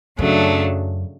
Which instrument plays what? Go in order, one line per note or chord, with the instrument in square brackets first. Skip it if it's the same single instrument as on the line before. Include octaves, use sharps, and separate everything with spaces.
[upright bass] F#2 [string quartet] C#3 F#3 A3 D4